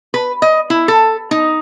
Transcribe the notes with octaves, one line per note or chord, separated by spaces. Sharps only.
B4
D#5
E4
A4
D#4